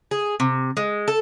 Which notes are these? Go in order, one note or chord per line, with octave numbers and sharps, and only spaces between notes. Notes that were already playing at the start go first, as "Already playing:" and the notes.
G#4
C3
G#3
A4